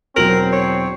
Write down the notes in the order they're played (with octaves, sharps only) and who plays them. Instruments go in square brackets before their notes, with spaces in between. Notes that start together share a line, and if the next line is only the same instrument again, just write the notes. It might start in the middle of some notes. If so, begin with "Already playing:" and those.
[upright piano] E1 F#3 F#7 [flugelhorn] C4 [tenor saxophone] A#4
[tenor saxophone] C#5